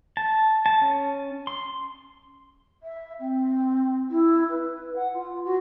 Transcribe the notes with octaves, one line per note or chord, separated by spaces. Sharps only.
A5
A5
C#4
C6
E5
C4
E4
B4
F#5
F4
F#4